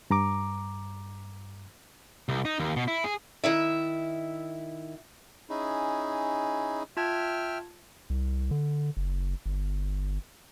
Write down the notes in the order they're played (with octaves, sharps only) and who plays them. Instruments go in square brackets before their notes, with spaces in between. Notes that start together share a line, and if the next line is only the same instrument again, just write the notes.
[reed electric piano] G2 A#5 D6
[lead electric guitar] C2
D#4
D#2
B2
E4
G#4
[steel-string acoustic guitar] D#3 E4 E5
[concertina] C#4 D#4 E4 G#4
[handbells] F4 A5 G#6 [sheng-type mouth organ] E5 G5 F6
[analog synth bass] C2
D3
F#1
G1